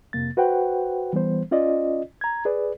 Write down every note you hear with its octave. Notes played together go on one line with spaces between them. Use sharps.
F2 C3 A#3 A6
F#4 B4 C5 F#5 G5
E3 G3 B3 C5
C#4 F4 D5 D#5
A#5 G#6
G#4 B4 D5